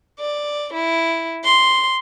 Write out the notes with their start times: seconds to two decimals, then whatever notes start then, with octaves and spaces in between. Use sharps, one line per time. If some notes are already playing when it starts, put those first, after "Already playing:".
0.20 D5
0.73 E4
1.44 C6